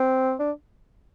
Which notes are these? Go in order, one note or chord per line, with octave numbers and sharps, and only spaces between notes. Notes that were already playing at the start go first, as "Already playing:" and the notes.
Already playing: C4
D4